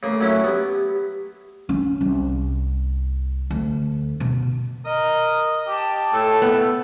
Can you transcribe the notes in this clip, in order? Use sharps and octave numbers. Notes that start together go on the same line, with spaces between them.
C#3 A3 A#3
F#3 C#4 E4
B3 G4
C#4
C2
D2
B2
A#4 D#5
G4 G5 A5
A2 A4
B3